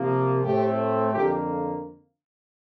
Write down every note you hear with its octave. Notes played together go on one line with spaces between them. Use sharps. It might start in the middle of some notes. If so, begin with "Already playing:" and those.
Already playing: C3 F3 A#3
A2 A3 C4 G4
F2 D3 F3 A#3 G4